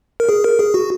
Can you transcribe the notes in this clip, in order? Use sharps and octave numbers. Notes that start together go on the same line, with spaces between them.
A#4
G#4
A#4
G#4
F#4